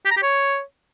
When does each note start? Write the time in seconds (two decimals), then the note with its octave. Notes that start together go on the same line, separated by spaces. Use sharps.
0.05 G4
0.11 A#5
0.17 G4
0.22 C#5